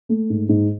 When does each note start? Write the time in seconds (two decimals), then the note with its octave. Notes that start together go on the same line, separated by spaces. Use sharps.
0.09 A3
0.30 G#2
0.49 G#2